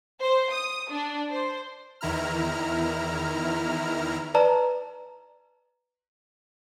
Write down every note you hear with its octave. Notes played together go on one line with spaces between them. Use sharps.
C5
D#6
D4
C5
E2 D#3 E4 A#5 F6
B4 D5 A5 A#5